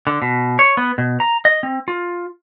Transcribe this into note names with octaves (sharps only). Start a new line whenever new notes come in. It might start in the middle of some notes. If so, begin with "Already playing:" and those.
D3
B2
C#5
B3
B2
A#5
D#5
C4
F4